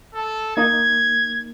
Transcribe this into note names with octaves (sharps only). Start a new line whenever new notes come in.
A4
A#3 D#4 G#6